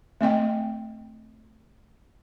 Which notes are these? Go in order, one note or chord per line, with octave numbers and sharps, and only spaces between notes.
A3 C4 D#5 G5